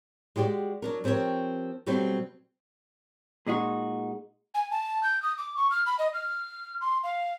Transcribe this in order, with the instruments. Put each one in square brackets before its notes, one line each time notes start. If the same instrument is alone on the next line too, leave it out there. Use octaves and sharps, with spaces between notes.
[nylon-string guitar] G#3 F#4 G4 C#5 D5
F#3 D4 A#4
F3 C4 G4 A#4 C#5
B2 F#3 G3 A3 C4 F#4
[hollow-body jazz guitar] A#2 G#3 D#4 F#4
[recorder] G#5
A5
G6
D#6
D6
C#6
F6
B5
D#5
F6
C6
F5